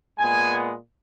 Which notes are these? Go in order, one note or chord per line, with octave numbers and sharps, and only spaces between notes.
A#2 G#3 B3 G#5